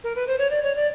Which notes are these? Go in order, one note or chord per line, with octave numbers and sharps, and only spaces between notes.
A#4
B4
C5
C#5
D5
C#5
D5